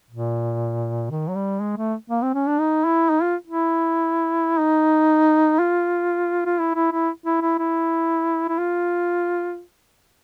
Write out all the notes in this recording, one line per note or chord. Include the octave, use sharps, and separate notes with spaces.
A#2
D#3
F#3
G3
G#3
A3
A#3
C4
C#4
D4
D#4
E4
D#4
F4
E4
D#4
F4
F4
E4
E4
E4
E4
E4
E4
E4
F4